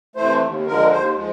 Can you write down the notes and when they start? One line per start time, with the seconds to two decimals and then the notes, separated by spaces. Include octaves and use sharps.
0.16 C3 E3 A3 C5
0.41 D#2
0.66 D3 F3 G#3 A#4
0.91 D#2 C5
1.16 F3 G#3